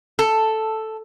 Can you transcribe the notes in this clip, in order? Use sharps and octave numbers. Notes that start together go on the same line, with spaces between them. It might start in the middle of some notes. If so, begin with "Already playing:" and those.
A4